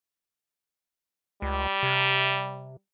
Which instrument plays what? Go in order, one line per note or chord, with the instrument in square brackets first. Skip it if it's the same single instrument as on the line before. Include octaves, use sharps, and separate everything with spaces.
[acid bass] C#2 [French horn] G3
[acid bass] C3